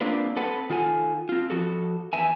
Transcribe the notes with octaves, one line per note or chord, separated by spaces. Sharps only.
A#3 C4 D4 F4 B4
C4 A4 B4 F#5
D#3 F4 A4 G#5
C4 F4
F3 F#4 A4
E2 B4 E5 G#5